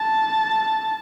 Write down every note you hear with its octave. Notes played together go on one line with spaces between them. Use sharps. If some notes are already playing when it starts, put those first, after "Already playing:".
Already playing: A5